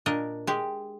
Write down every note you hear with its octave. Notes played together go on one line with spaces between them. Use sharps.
A#2 D4 A#4 D#5
G#3 G4